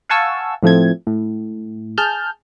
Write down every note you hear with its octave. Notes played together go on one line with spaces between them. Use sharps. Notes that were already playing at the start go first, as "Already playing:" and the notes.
F5 F#5 G#5 A5 C#6 E6
A2 F3 A3 C4 G#6
A2
G#4 A5 F6 G6